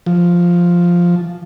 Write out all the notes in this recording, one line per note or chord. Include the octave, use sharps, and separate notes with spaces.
F3